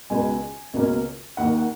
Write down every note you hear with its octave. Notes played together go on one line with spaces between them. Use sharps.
C#2 B2 G#3 G#5
C#2 B2 A#3 C#4
D#2 D#3 A#3 F#5
F#5